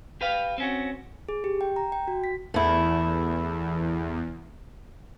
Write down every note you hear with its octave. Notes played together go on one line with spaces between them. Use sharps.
G4 B4 F5
C4 C#4 F#4
G#4
G4
G5
A#5
G5
F#4
B6
E2 A3 E4